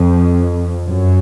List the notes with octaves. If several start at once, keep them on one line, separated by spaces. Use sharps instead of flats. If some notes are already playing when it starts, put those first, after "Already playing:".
Already playing: F2
F#2